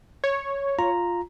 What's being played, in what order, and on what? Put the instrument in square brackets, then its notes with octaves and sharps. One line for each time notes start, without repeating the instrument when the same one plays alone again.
[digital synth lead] C#5
[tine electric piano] F4 A#5